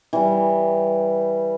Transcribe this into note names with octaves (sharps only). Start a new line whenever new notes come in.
E3 G3